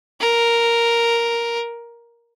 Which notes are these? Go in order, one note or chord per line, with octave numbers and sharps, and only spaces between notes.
A#4